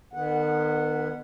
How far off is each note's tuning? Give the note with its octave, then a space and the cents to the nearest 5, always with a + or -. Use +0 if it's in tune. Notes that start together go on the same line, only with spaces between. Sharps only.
D#3 -40 B3 +0 F#5 -10